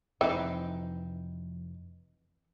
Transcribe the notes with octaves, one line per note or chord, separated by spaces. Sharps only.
F1 E3 F3 C4 D#4 B4 E5